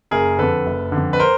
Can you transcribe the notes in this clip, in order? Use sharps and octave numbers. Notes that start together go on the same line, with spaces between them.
F#1 G#4 A#4
F2 D3 A4 B4
F#1
F2 D3
B4
A#4 C5